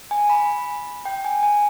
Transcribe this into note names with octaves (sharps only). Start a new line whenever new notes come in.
G#5
B5
G5
G#5
G#5